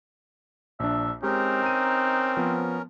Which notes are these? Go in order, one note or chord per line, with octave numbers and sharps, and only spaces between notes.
A#1 D4 E5
G#3 C4 C#4 D#4 G4 A#4
A#5 D#7
F3 B3